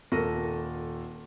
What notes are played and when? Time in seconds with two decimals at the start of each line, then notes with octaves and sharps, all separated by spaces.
0.12 D#1 A4 A#4 A#6 D#7